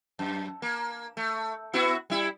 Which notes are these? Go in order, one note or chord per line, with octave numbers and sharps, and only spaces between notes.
F#2
A#3
A3
B3 E4 F#4
G3 E4